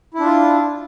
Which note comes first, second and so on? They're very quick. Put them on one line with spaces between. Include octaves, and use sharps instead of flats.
E4 D4 F4